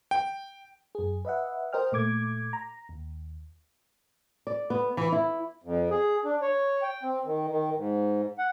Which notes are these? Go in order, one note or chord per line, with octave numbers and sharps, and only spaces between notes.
G5
F#2 G#4
B4 D#5 E5 F#5
A#4 C5 D#5 G5 F6
A#2 A3 D6 G#6
A#5
D#2
D5
B3
E3
E4
F2
G#4
D4
C#5
G5
C4
D#3
D#3
G#2
F#5